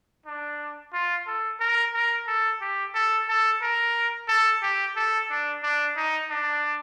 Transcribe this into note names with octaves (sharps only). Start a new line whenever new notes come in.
D4
F4
A4
A#4
A#4
A4
G4
A4
A4
A#4
A4
G4
A4
D4
D4
D#4
D4